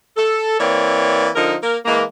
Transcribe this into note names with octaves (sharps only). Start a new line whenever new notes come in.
A4
E3 A#3 C4 C#5 D5
D3 F3 D#4 A#4
A#3 A#4
E3 G#3 A#3